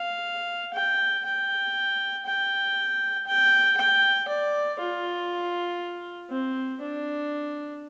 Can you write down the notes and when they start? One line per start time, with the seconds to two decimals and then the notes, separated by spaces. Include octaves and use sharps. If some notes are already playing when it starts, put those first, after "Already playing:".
Already playing: F5
0.74 G5
1.25 G5
2.25 G5
3.26 G5
3.77 G5
4.28 D5
4.78 F4
6.30 C4
6.81 D4